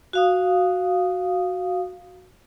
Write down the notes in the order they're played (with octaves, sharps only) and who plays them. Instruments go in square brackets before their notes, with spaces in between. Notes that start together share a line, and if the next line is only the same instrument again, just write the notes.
[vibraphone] F#4 F5 D#6